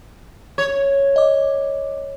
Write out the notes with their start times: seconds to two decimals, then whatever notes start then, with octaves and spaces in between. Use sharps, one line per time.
0.58 C#5
1.16 D#5 D6